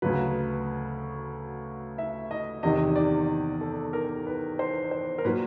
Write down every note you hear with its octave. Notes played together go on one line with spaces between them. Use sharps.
D2 C#3 F#3 B4
E5
D#5
E2 C3 D#3 D#5
D5
A4
A#4
B4
C5
C5
A#4
A#2 F#3 B4